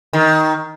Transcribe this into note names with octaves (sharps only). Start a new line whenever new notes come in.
D#3